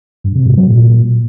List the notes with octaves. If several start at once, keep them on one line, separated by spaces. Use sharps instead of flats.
G2
C3
G#2
F#3
A#2